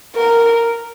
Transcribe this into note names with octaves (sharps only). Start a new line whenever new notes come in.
A#4